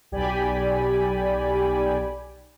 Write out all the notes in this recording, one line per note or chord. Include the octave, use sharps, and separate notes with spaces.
B1 G4 D5 G#5 B5